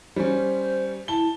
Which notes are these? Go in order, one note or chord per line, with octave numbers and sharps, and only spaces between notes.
G3 C#4 C5
E4 A5 G7